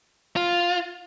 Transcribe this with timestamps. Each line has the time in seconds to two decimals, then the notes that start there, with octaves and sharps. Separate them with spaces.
0.36 F4